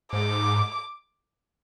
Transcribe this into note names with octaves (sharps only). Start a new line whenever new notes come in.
G#2 D6